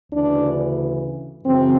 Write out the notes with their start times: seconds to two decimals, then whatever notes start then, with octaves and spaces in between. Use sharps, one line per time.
0.12 D2 C#3 E3 D4
1.45 F#2 C#3 E3 C4